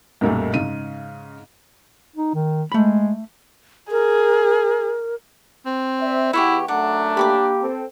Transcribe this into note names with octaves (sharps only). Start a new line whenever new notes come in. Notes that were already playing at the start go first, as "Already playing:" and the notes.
B1 F#2 A#2 G3 A3
G#2 C#3 D#7
D#4
D#3
G#3 A3 B5
G#4 A#4
C4
C5 D5 E5
E2 E4 G4 C#5 F#5
F#2 A3 D4 F#5 A#5
A#3 G4 B5 C#6 D6
C4 A4